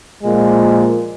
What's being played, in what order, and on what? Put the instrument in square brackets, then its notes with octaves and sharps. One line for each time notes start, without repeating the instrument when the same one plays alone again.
[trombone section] A#2 F3 G#3